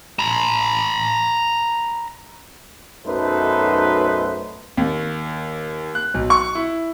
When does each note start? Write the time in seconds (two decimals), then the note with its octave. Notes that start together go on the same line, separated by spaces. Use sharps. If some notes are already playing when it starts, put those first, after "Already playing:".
0.19 A#5 B5
3.06 B1 F#2 A3 D#4 B4 C5
4.77 D#2
5.95 F#6
6.14 B1
6.30 C#6
6.55 E4